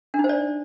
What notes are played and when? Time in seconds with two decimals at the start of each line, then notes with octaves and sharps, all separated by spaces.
0.14 D4
0.19 D#4
0.24 C5
0.29 D5